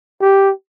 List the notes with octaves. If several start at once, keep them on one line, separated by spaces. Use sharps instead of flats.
G4